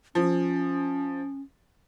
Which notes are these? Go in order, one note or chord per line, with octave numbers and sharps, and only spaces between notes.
F3 C#4